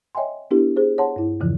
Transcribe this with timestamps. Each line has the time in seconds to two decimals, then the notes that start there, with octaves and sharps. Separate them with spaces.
0.15 C#5 D#5 E5 G5 G#5 C6
0.51 B3 D4 E4 G4 A#4
0.76 G#4 C5
0.98 C#5 F#5 A5 C6
1.16 G2 E4
1.40 E2 G2 C#3 E3 F3